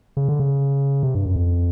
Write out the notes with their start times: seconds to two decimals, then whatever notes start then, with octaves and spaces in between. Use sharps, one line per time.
0.17 C#3
0.29 D3
0.40 C#3
1.03 C3
1.15 G2
1.26 F#2
1.36 F2